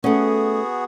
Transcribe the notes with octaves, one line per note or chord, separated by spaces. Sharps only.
A3 B3 C#4 F#4 G#4